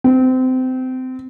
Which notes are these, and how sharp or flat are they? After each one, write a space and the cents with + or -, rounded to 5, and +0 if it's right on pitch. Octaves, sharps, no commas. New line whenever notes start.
C4 -25